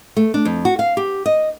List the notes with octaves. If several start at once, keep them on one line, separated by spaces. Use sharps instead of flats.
A3
D4
F2
F#4
F5
G4
D#5